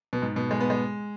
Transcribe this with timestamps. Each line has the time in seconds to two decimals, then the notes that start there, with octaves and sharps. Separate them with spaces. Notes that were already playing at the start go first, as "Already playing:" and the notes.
0.13 B2
0.22 G#2
0.36 B2
0.51 G#3
0.60 B3
0.70 G#3